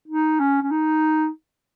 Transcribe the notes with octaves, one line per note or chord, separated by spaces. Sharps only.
D#4
C#4
C#4
D#4